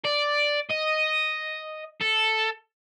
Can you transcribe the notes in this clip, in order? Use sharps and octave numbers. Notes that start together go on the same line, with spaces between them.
D5
D#5
A4